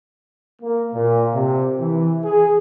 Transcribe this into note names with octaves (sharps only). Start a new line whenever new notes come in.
A#3
A#2
C3
E3
G#4